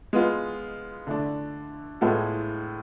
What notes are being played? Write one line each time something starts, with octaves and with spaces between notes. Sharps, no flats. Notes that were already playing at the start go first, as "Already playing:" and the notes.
G#3 B3 F4
D3 A3 D4
A2 G#3 B3 F4 A4